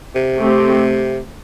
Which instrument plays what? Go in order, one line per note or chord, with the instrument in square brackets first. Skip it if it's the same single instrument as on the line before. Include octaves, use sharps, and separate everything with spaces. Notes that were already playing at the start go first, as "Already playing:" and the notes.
[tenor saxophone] C3
[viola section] A3 C4 G4